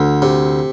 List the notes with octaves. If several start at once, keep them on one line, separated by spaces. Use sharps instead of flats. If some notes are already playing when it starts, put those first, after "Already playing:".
Already playing: D2
C3